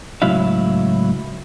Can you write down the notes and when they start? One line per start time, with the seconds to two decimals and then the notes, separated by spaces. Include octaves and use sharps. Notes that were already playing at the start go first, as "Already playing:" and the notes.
0.22 C#2 A2 F#3 E4 E5 F5